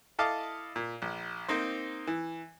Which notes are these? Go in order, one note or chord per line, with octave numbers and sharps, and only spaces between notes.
E4 A4 D#5 F5 A5 D6
A#2
A#1
A#3 C4 D#4 C5
E3